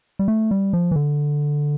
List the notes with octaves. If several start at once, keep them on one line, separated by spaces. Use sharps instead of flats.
G3
A3
G3
F3
E3
D3